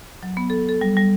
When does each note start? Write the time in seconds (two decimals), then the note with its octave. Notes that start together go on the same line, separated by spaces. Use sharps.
0.23 F#3
0.37 B3
0.50 A4
0.69 A4
0.81 G3
0.97 G3